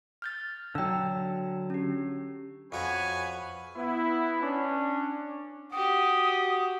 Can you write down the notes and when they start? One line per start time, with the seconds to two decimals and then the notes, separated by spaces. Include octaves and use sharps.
0.22 F6 G6 A6
0.75 D3 F#3 G5 E6
1.70 C#4 G4
2.72 F2 F#4 B4 C#5 G#5 A#5
3.76 B3 E4
4.42 C#4 D4
5.72 F#4 G4 D#6